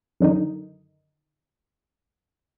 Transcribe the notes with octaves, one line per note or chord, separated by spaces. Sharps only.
F#2 D3 D#3 D#4